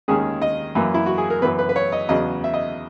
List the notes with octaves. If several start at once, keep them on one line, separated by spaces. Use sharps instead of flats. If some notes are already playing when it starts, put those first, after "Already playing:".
D#2 D#3 G#3 C#4 G#4
D#5
F#2 E3 A#3
E4
F#4
G#4
A#4
F#2 E3 B3 B4
B4
B4
C#5
D#5
E2 C#3 F#3 B3 D#5
E5
D#5